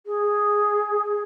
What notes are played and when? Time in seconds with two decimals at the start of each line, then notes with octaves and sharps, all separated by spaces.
0.06 G#4